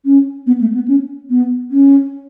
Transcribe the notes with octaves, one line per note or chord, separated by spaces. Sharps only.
C#4
B3
A3
B3
C#4
B3
C#4